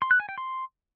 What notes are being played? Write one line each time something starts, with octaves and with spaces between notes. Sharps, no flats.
C6
F#6
G#5
G5
C6